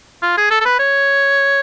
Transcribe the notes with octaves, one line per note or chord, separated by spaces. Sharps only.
F4
G#4
A4
A4
B4
C#5